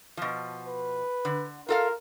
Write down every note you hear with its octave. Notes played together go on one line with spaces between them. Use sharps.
B2 F3
B4
D3
F4 A4 A#4 F5